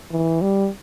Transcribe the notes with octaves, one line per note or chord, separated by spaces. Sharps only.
E3
G3